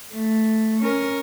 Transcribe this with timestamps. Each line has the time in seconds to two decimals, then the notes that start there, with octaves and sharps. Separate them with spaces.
0.13 A3
0.82 C#4 A#4